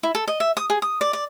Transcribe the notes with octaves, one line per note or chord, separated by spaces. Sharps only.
E4
A4
D#5
E5
D#6
G#4
D#6
D5
D5